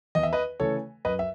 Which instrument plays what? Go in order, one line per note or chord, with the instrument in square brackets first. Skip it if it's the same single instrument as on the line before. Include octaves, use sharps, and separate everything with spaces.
[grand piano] E2 D#5
E5
B4 D#5
C#3 E3 A3 A4 C#5
F#2 B4 D#5
E5